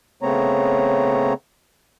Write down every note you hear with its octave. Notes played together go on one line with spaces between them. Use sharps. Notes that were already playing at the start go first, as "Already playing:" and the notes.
C#3 A3 B3 C4 C#5 A#5